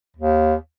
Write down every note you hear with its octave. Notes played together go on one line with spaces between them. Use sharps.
D#2